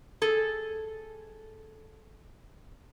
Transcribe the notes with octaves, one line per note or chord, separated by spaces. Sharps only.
G#4 A4